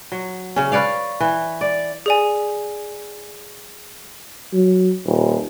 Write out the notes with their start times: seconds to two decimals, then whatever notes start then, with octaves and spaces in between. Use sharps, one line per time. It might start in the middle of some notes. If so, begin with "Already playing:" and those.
0.12 F#3
0.56 C#3 C#4
0.72 B4 C#5 D5 F5
1.20 E3
1.61 D5
2.06 G#4 D5 G#5
4.53 F#3
5.05 D#1